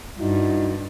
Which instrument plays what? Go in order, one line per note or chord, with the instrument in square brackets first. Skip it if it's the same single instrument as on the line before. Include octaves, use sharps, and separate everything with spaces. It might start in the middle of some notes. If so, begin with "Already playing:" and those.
[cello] G2 [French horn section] D#4 E4 F#4